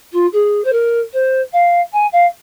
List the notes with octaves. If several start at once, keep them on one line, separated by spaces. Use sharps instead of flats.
F4
G#4
C5
A#4
C5
F5
G#5
F5